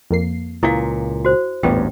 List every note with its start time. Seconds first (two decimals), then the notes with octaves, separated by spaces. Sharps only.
0.11 F2 A#3 C7
0.63 C#2 A#2 E4 F5
1.25 F#4 C5
1.63 A1 E2 G2 A#2 A3 B3 G5